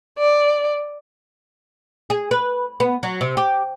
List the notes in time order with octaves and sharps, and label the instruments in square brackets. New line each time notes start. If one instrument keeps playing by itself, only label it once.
[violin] D5
[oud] G#4
B4
B3
F#3
C3
G4